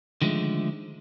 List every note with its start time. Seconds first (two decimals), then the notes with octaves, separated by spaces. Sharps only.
0.22 D3 D#3 F3 G#3 A3